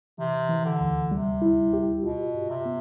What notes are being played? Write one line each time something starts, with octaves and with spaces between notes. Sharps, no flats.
C3 E3
E3
D3
D2
C3 G3
E4
G4
B2 F4
G2
C3
B3